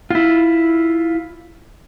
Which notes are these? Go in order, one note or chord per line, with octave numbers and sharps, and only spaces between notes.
E4 F4